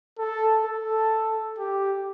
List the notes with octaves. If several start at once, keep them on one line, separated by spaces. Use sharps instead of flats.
A4
A4
G4